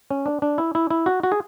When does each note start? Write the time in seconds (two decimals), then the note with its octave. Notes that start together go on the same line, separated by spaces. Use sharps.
0.10 C#4
0.26 D4
0.42 D4
0.58 E4
0.75 E4
0.90 E4
1.06 F#4
1.23 F#4
1.32 G#4